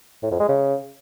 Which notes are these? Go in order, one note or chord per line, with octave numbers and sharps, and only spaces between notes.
A2
F2
G#3
C#3